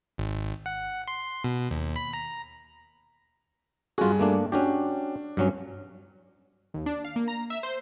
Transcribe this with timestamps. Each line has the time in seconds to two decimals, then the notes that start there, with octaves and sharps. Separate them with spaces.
0.18 G#1
0.66 F#5
1.08 C6
1.44 B2
1.71 D#2
1.96 B5
2.13 A#5
3.98 G2 F4 F#4 G#4
4.20 A3 A#3 D4
4.52 C#4 D4 F#4 G4
5.37 G2 F#3 C#4
6.74 D#2
6.86 D4
7.04 F5
7.16 A#3
7.28 A#5
7.50 E5
7.63 C5